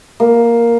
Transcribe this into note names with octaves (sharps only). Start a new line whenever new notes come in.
A#3